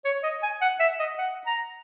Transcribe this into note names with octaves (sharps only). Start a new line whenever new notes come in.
C#5
D#5
G#5
F#5
E5
D#5
F#5
A#5